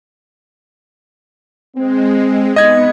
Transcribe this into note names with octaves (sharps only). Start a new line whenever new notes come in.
G#3 C4
C3 B3 D#4 D#5 G#6